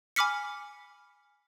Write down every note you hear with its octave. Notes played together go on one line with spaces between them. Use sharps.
G#5 B5 D6 F6 B6 C#7